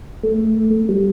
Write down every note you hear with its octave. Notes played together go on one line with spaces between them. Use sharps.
A3
G3